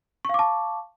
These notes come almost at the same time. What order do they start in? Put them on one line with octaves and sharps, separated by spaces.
C#6 F5 D6 A5